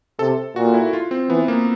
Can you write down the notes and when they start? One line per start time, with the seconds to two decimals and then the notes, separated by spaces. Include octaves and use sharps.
0.19 C3 A4
0.56 A#2 F#4
0.74 E4
0.93 F4
1.11 C4
1.30 E3 B3
1.48 A#3